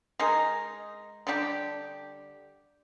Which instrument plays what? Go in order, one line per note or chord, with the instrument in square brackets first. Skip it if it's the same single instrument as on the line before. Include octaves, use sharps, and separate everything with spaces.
[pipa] G#3 D#4 A#4
D3 G3 D4 G4